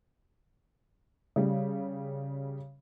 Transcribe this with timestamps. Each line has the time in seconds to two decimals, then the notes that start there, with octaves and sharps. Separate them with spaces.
1.36 C#3 G3